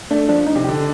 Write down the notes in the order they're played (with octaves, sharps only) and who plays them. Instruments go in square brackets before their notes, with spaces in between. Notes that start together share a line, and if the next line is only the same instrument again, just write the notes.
[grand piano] A3 [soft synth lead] D4
[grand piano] F3 [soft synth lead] D4
[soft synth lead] D#4
[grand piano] C3
[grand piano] D3 [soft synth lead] G4